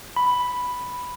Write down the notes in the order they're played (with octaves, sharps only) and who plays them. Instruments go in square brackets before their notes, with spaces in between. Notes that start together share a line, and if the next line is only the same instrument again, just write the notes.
[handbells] B5